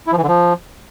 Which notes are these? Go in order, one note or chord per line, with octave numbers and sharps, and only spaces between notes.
E4
F3
E3
D3
F3